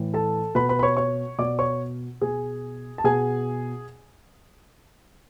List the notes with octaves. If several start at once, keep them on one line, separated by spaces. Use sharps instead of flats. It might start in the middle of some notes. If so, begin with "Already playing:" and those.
Already playing: A2 E3
A4 A5
B2 B4 B5
B4 B5
B5
C#5 C#6
C#5 C#6
B2 D5 D6
C#5 C#6
B2 G#4 G#5
A5
B2 G#4 G#5